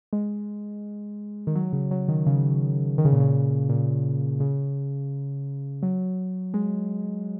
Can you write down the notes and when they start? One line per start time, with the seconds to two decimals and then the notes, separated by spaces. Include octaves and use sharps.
0.13 G#3
1.47 D#3
1.55 F#3
1.73 C#3
1.91 F#3
2.08 D#3
2.26 C#3
2.98 D#3
3.05 C#3
3.12 A#2
3.20 C#3
3.69 A#2
4.40 C#3
5.83 F#3
6.54 G#3